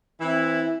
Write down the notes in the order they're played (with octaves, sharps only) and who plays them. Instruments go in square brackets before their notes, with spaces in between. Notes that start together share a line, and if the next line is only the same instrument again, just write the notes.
[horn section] E3 C4 E4